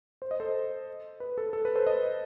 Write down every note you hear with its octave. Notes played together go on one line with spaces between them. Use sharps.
C5
D#5
A4 C5
B4
A4
A4
B4
A4 C5
B4 D#5